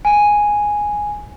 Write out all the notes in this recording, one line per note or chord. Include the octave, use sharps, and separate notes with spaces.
G#5